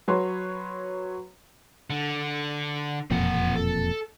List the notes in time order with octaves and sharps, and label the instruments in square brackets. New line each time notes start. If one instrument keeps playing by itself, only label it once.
[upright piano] F#3 B4 C#5 C6
[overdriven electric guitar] D3
[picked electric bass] E1 F2 A#2 [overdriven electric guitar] C4 F#5
[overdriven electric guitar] A4